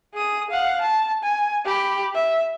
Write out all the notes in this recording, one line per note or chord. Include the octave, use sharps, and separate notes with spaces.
G#4 D#6
F5 F#5
A5
G#5
G4 B5
E5